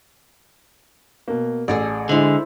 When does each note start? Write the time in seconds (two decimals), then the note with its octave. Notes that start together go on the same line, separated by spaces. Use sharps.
1.28 B2 A#3
1.68 A1 G#4 A4 D5
2.09 D3 G#3 E4 C5